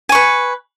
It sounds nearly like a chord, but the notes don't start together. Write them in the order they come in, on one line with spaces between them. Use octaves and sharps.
G#5 C#6 B4